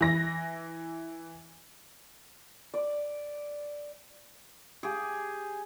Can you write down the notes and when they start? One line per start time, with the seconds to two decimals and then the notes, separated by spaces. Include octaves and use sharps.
0.01 E3 A#6
2.74 D5
4.83 G4 G#4